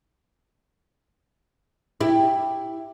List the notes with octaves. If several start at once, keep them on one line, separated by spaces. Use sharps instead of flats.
E4 G4